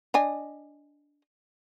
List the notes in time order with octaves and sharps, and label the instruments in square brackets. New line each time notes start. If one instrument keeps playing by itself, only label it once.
[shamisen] D4 D#5 G#5